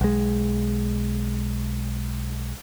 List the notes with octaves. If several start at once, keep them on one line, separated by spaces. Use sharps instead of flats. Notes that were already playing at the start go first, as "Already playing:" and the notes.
B1 G#3